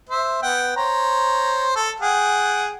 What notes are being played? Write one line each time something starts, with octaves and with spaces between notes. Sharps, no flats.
C5 E5
B3 F#5 G5
C5 C#5 A#5
A4
G#4 F#5 G5